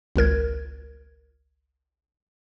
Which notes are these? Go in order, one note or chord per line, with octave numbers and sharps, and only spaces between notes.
G#1 C#2 A#4 G#6